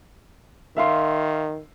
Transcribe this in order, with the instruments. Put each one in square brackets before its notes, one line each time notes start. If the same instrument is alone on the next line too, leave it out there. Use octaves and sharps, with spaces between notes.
[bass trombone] D#3 [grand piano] E5 F5 C6